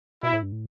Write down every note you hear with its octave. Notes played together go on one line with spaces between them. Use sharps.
B2 E4
A2
G2
A2